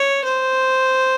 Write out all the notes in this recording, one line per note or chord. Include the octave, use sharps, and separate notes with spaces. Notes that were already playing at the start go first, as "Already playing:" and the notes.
Already playing: C#5
C5